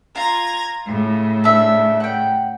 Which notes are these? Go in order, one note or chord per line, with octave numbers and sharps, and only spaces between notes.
F4 A#5 G#6 A#6
A2 C#3
D4 E5
F#5 G5